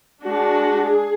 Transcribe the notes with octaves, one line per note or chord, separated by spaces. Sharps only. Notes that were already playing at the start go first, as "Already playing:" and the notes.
G#3 D4 F#4
G#4